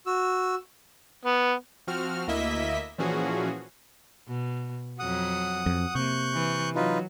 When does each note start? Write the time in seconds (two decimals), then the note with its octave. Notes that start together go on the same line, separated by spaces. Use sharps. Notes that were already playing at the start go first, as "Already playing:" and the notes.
0.06 F#4 E6
1.25 B3
1.87 F3 C4 F#4 F6
2.27 D2 A#3 E4 D#5 E5 B6
2.98 A#2 E3 F3 C#4 F#4 G#4
4.28 B2
4.99 F2 F#3 F#5 D#6
5.66 F2
5.95 C3 A#3 C#6 F#6 G6
6.34 E3
6.75 F#3 D#4 F4 B4